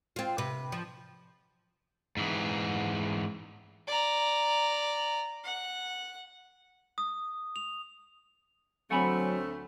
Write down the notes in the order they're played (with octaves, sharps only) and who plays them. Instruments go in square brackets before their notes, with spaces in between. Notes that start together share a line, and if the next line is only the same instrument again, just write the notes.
[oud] C4 F4
C3 B4
F3
[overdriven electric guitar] G#2 E3
[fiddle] D5 A#5
F#5
[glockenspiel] D#6
F7
[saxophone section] D2 A3 [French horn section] F#3 [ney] C4 [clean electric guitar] F#5 G#5 B5